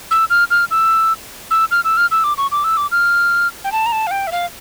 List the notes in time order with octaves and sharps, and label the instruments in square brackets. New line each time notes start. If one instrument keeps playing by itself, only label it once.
[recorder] E6
F6
F6
E6
E6
F6
E6
F6
E6
D6
C#6
D6
E6
D6
F6
G5
A5
A#5
A5
F5
G5
E5
F5